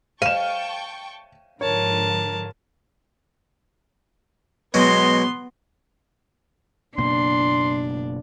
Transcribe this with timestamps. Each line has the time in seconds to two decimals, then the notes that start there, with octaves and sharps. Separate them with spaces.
0.22 F5 G5 A5 C#6 D#7 E7
1.61 G#2 D3 F3 A#4 C#5 A5
4.74 B2 F#3 G#3 B3 C6
6.97 F#1 B2 A#3 D4 C6